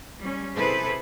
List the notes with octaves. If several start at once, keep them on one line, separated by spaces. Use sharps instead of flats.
G3 C#4
C3 E4 G#4 A4 B4 C5